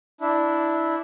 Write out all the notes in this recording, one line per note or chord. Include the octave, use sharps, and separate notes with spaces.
D4 E4